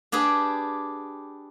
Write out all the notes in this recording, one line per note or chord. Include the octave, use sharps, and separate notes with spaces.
D4 G4 G#4 B4